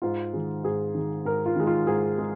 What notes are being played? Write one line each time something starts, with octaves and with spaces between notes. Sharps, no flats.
G#2 F4
D#3 G#3
G#2 G#4
D#3 G#3
G#2 A#4
F4
D#3 G#3
F4
G#2 G#4
G#3